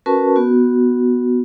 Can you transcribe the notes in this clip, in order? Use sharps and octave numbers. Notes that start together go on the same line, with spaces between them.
C#4 F#4 A#4 B4 A5 C#6
B3 F#4